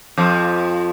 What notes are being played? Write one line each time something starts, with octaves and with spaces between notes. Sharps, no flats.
F2 F3